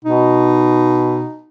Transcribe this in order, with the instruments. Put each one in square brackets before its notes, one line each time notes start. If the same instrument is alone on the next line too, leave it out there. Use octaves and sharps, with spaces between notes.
[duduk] B2 [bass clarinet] D#4